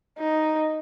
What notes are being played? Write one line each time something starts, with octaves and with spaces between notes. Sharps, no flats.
D#4